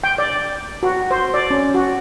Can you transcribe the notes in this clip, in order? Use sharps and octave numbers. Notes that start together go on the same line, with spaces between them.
G5
D5
F#4
C5
D5
C#4
F#4